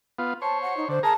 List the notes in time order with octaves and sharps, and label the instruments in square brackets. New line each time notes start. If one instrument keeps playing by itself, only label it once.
[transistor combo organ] B3 F4
[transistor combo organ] C5 C#5 [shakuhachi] A5
[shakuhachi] F#5
D#4
[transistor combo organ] D3 [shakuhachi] C5
[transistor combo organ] G#4 A#4 A#5 [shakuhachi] A5